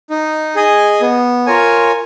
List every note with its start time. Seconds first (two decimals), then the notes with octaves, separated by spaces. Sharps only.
0.10 D#4
0.55 G#4 D#5 G#5
1.01 B3
1.46 F4 A#4 C#5 G#5